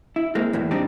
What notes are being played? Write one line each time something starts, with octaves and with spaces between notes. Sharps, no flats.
E4
G#3 A#3 C4
E2 A2 E3
G3 C4 D4 D#4 G4